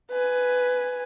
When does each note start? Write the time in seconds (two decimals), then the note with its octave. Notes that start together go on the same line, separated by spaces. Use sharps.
0.11 B4 G#5